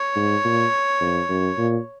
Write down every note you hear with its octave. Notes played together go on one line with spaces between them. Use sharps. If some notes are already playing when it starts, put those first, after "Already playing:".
Already playing: C#5
G#2
A#2
F2
F#2
A#2